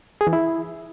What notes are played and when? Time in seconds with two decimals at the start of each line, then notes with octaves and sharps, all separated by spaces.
0.21 G#4
0.27 E3
0.33 E4